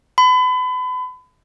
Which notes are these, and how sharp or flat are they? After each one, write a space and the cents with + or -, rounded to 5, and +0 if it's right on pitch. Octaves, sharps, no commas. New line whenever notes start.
B5 +35